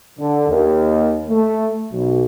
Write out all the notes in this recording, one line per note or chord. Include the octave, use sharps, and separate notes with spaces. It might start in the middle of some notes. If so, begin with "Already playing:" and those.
D3
D#2
A3
B1